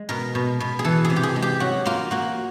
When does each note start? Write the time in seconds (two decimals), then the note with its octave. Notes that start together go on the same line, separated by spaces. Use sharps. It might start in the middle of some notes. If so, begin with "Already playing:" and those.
Already playing: G#3
0.09 B2 A#4
0.35 B2
0.60 B2
0.79 G#4
0.84 E3 A4
1.05 G#4
1.10 C3
1.16 G4
1.23 G#4
1.36 G#3
1.42 G4
1.60 F#3 F#4
1.86 A#3 F4
2.11 A#3 F#4